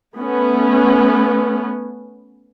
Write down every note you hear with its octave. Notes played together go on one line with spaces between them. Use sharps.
A3 B3 C#4